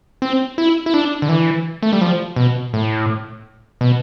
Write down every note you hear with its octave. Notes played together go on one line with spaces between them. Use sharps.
C4
E4
E4
D4
D3
E3
A3
G3
F3
B2
A2
B2